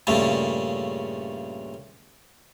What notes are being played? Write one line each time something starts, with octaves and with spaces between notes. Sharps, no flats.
G2 A#2 C#3 A3